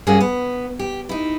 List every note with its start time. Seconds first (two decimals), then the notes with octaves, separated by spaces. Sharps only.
0.07 G2 A#3 C#4 F#4 G#4
0.21 B3
0.79 G4
1.09 D#4 E4